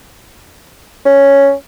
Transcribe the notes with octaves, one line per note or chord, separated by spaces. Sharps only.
C#4